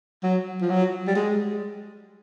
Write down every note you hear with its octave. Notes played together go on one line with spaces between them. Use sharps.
F#3
F3
F#3
G3
G#3